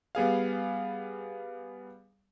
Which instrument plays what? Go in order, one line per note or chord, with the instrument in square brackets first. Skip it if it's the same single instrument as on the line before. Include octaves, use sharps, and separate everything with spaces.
[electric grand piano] G3 B3 G#4 F5